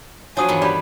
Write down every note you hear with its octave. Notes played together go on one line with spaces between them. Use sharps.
F3 F#3 D4 C#5 G#5 D#6
E2 G2 D#3
G3 G4 B4 D5 B5